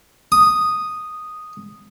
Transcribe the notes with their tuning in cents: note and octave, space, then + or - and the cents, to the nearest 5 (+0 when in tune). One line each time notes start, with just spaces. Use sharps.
D#6 -5